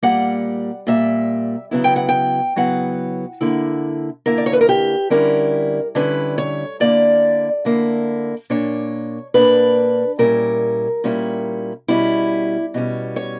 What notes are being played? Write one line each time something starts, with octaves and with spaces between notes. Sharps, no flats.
A#2 G3 A#3 F#5
A#2 G3 A#3 E5
C#3 F#3 B3 E4
G5
F#5
G5
C#3 F#3 B3 E4 F#5
D3 A#3 E4
D3 A#3 E4 A#4
D5
C#5
B4
A#4
G4
D3 G3 C#4 E4 A#4
D3 G3 C#4 E4 B4
C#5
D3 A#3 E4 D5
D3 A#3 E4
A#2 A#3 D4 C#5
A#2 A#3 D4 B4
A#2 G3 C#4 E4 A#4
A#2 G3 C#4 E4
B2 G3 C#4 E4
B2 G3 C#4
C#5